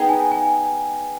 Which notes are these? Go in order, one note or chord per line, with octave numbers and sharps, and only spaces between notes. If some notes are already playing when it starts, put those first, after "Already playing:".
Already playing: B3 D#4 G#4 G5
G#5
G#5